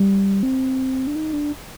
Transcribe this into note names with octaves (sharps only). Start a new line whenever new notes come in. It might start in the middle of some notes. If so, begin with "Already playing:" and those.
Already playing: G3
C4
D4
D#4
D4